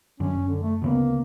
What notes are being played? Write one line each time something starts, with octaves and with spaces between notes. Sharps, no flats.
F#2 D3 C#4
F#1
D3
A3
D2 C#3 A#3 B3